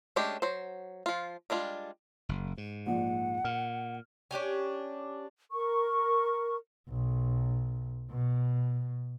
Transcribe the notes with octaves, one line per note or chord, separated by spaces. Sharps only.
G#3 A3 C#4 D4 G4
F#3 C5
F3 F4
G3 G#3 D4 F4
F#1
G#2
A#1 F3 D5 F#5
A#2 F6
C#4 D4 G4 G#5
A#4 C#6
B1
B2